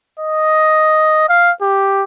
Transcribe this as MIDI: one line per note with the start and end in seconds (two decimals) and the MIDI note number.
0.20 1.25 75
1.29 1.51 77
1.62 2.04 67